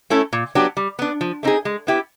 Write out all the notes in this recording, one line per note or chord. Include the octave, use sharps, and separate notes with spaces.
A3 C#4 E4 A4
A#2
F#3 B3 D4 G4
G3
B3 D4
F3
A3 C4 D#4 G#4
G#3
B3 E4 G4